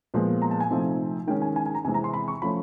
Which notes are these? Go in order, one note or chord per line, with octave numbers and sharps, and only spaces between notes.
A#2 F3 G#3 B3
A#5
A5
G#5
C3 F3 A3 C4 D#4
D#3 G#3 C#4 G5
G#5
G#5
G#5
A#5
C3 E3 G#3 C4 G#5
A#5
C6
B5
C#6
F3 A3 C#4 B5